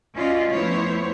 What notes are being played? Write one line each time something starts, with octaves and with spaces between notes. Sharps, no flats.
C#4 F4 F#4 D5 D#5
F2 A3 B3 E4 C5 C#5